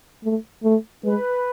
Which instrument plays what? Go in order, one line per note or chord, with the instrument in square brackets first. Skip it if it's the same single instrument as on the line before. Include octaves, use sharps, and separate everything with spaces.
[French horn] A3
A3
[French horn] G#3 [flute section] B4